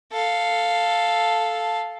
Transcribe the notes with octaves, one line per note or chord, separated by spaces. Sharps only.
A4 F5